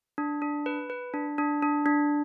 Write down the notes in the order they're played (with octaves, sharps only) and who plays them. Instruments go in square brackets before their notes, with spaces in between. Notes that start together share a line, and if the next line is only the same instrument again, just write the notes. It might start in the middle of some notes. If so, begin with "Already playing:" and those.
[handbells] D4
D4
B4
B4
D4
D4
D4
D4